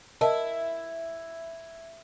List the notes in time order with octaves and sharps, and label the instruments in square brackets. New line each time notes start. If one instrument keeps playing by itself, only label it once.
[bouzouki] E4 [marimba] A#4 D#5 A5